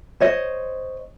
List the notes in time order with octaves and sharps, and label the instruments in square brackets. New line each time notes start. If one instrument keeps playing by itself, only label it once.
[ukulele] C5 C#5 D#5